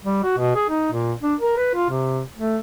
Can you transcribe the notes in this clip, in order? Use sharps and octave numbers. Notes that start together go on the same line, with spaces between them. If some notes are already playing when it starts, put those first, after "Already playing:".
G3
F#4
B2
G#4
D#4
A#2
D4
A#4
B4
F4
C3
A3